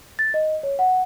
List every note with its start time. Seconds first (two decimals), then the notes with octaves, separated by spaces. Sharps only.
0.19 A6
0.34 D#5
0.63 C#5
0.79 F#5